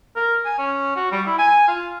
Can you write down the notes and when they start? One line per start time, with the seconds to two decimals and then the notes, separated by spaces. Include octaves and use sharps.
0.16 A#4
0.45 G#5
0.58 C#4
0.96 F#4
1.12 G3
1.26 E4
1.38 G#5
1.68 F4